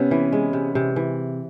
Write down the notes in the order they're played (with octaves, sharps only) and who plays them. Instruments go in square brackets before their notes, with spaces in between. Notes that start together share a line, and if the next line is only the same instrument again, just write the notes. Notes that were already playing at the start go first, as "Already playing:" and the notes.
Already playing: [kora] C3 [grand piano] B3 C#4
[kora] E3
G#3
C3
C3
E3